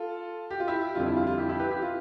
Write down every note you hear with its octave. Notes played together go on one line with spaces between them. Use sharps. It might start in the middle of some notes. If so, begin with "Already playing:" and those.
Already playing: F4 A4
G4
F4
E4 G4
F2 D3 G3 F4
E4
F4
F4
E4 G4
E4 G4
G4 B4
E4 G4
F4